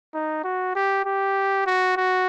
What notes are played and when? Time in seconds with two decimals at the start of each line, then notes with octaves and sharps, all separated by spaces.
0.14 D#4
0.44 F#4
0.75 G4
1.05 G4
1.66 F#4
1.97 F#4